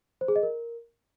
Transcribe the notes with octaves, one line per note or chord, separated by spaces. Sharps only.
C5
G#4
D#5
A#4